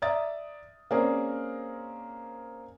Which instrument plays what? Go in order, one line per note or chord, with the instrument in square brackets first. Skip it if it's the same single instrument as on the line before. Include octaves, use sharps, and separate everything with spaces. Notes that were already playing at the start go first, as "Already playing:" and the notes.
[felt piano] D5 E5 A#5 D#6 A6
A#3 C4 C#4 G#4 A#4 D5